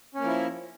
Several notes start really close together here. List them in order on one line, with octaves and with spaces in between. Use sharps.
C#4 A#3 F3 E4